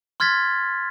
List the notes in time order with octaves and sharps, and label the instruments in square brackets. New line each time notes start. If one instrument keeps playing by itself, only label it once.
[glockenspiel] C6 F6 G#6 A6 B6